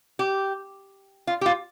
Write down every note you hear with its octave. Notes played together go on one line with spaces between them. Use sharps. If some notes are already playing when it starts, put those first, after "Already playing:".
G4
F4
G4
F4